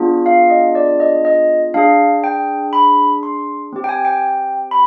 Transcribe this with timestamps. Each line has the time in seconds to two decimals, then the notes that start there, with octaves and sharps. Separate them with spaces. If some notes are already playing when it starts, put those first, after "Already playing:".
Already playing: B3 D4 F4 G#4
0.26 F5
0.50 D#5
0.75 D5
1.00 D#5
1.25 D#5
1.74 D4 G#4 F5
2.24 G5
2.73 B5
3.23 C6
3.73 C4 G4
3.84 G5
3.89 G#5
4.05 G5
4.71 B5